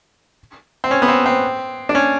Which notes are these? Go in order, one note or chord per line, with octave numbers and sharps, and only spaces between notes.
C4
C#4
B3
C4
C4
D4
C#4